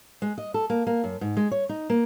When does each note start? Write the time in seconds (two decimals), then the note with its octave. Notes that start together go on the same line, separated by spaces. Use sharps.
0.22 G#3
0.38 D#5
0.54 A4
0.70 A#3
0.87 A#3
1.04 F#2
1.21 G#2
1.37 G#3
1.51 C#5
1.69 D#4
1.90 A#3